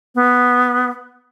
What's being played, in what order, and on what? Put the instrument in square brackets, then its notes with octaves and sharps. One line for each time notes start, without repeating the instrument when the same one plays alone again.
[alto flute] B3